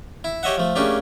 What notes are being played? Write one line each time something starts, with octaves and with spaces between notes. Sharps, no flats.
E4
G4 C#5 D#5 E5 F#5
F3 A3
A3 A#3 C#4 D4 G4 G#4